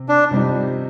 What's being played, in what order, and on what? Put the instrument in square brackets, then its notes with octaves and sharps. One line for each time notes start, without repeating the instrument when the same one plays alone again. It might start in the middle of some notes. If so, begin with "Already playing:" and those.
Already playing: [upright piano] C3 C4
[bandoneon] D4
[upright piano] C3 G3 C4 D#4